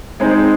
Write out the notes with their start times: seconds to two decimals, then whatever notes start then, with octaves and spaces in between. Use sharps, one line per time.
0.20 G#3 C4 D#4 G#4 C5